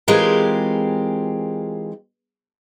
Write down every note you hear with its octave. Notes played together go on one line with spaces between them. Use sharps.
E3 G#3 C4 F4 G4 A#4